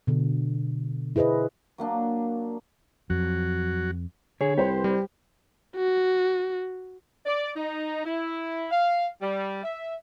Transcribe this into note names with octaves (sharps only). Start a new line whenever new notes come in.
B2 D3
E4 G#4 B4 C5 D#5
F#3 A#3 D4
F2 F#3 F#4
D3 G#4 C#5
C2 G4 B4 C5
G3
F#4
D5
D#4
E4
F5
G3
E5